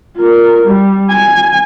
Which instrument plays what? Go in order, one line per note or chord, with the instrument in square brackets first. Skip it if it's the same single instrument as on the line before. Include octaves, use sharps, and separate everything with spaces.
[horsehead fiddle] F4 A#4
G3
G#5